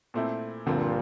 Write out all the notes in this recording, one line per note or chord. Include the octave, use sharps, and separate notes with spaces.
A#2 A3 C4 E4
D2 G2 A#2 D3 F3 C4 F4